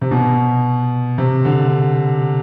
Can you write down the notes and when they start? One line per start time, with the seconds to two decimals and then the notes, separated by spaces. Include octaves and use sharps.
0.01 C3
0.11 B2
1.18 C3
1.45 D3